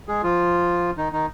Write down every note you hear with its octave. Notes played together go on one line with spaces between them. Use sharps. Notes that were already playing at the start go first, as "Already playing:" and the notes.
G#3 G#4
F3 F4
D#3 D#4
D#3 D#4